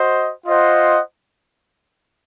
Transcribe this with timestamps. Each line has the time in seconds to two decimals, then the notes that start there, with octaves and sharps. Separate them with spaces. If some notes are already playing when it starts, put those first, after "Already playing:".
Already playing: F#4 C5 D#5
0.46 F4 C5 D#5 F#5